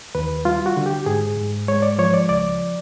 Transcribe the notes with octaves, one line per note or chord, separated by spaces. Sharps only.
D#2 B4
G3 F4
F#4
D3
G4
G#2 G#4
G#2
G#3 C#5
D5
F3 C#5
D5
C#2 D5